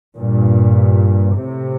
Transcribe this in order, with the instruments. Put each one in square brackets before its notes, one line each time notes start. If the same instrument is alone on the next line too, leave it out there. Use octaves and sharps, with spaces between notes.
[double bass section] G2 A#2
A2 C3